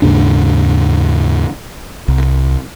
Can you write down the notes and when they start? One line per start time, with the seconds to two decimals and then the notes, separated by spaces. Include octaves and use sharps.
0.02 D#2 G#2 C#3 D4
2.08 C2